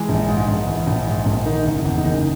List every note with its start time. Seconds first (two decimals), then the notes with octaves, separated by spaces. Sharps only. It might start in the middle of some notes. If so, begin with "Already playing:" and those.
Already playing: E3 G#3
0.09 A#1
0.28 G#2
0.48 A#1
0.67 E3
0.87 A#1
1.07 G#2
1.26 A#1
1.46 D#3 D#4
1.65 F#1
1.85 E2
1.98 D#4
2.05 F#1